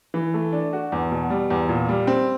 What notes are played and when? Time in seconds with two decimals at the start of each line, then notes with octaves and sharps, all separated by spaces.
0.14 E3
0.34 A3
0.52 D4
0.73 F#4
0.92 E2
1.12 B2
1.30 G3
1.50 E2
1.69 A#2
1.89 G3
2.07 C4